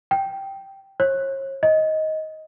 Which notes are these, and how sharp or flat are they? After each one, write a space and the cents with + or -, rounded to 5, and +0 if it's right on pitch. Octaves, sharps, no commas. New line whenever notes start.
G5 -5
C#5 -40
D#5 +15